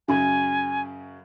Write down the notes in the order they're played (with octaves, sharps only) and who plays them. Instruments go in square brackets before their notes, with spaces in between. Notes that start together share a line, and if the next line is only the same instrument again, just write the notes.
[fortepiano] F#2 C#3 [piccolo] G#5